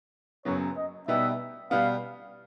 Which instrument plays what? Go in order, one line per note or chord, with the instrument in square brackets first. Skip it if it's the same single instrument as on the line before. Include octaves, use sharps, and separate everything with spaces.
[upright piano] F#1 F#2 C#3 F#3 B3 [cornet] C#5
[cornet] D#5
[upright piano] B2 G3 B3 D#4 G4 [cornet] E5
[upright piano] B2 G3 B3 [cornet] F5